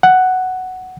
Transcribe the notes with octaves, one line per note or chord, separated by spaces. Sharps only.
F#5